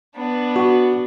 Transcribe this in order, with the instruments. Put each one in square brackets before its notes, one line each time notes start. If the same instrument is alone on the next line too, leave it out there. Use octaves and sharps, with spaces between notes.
[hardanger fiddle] B3 D4
[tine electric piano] F#4